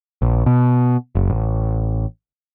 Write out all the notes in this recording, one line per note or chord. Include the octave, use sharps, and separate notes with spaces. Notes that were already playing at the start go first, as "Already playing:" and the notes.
A#1
B2
F#1
A1